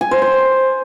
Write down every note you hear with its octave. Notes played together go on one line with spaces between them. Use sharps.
G#5
C5
C5